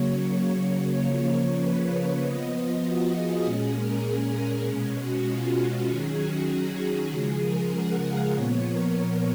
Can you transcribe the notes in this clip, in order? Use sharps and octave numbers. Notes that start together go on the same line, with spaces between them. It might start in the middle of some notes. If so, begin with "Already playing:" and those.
Already playing: C#3 F#3 A#3 C#5
C#5
C#3 F3 A#3
C#5
B4
C#5
F3 B3 D#5
F4
F#4
G#4
A#2 G#3 C#4 G#4
A#4
G#4
B2 G#3 C#4
F#4
F4
F#4
D#3 F#3 C#4 G#4
F#4
G#4
C#3 F3 G#3 G#4
A#4
F#5
F5
A#2 F3 B3 C#5
A#4